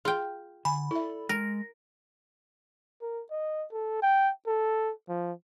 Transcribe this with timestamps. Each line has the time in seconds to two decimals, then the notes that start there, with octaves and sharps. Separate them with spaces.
0.05 F4 G#4 G5
0.65 D3 G#5 B5
0.91 E4 A4 D5 E5
1.29 G#3 A#4 A#6
3.02 A#4
3.31 D#5
3.72 A4
4.02 G5
4.47 A4
5.09 F3